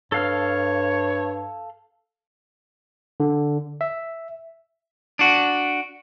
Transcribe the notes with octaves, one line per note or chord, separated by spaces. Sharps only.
G2 A4 C#5 F5 F6
D3
E5
D4 F#4